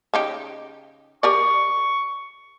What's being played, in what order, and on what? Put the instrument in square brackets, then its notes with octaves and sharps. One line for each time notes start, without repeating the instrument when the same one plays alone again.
[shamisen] C#3 D#4 G4
[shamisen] G4 A#4 D5 [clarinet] C#6